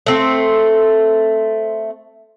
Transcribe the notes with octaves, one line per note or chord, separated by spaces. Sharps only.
A3 C4